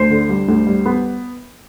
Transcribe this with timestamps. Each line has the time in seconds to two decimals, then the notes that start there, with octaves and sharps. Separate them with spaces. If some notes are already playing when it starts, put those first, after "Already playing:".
Already playing: D2 C5
0.10 D3
0.29 G3
0.48 D2
0.67 G3
0.86 B3